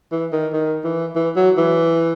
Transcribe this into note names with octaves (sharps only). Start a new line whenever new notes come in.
E3
D#3
D#3
E3
E3
F#3
E3